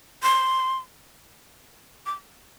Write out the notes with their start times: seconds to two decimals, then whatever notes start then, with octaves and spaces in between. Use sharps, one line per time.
0.23 C6
2.06 D6